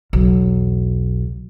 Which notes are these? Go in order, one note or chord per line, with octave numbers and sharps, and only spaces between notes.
B1 E2